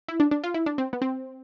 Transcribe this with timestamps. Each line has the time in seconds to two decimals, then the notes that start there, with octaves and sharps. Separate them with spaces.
0.08 E4
0.20 D4
0.31 D4
0.44 F4
0.54 E4
0.66 D4
0.78 C4
0.93 B3
1.02 C4